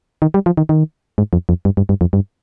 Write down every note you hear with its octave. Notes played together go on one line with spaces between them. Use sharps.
D#3
G3
F3
D#3
D#3
G#2
F2
F2
G2
G2
G2
F2
G2